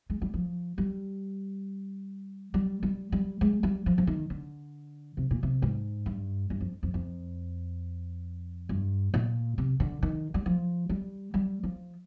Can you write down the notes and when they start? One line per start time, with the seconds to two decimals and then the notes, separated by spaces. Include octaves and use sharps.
0.10 G#3
0.22 G3
0.34 F3
0.78 G3
2.54 G3
2.83 G3
3.12 G3
3.41 G#3
3.63 G3
3.86 F3
3.98 F3
4.07 D#3
4.30 D3
5.17 C3
5.31 A#2
5.43 C3
5.62 G#2
6.06 G2
6.50 G2
6.61 F2
6.83 F2
6.94 F2
8.69 G2
9.14 A#2
9.58 C3
9.80 D3
10.03 D#3
10.34 G3
10.46 F3
10.89 G3
11.34 G3
11.63 F3